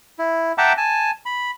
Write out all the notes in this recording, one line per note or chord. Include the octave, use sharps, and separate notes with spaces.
E4
E5 F#5 G5 A5 A#5 D6
G#5 A5
B5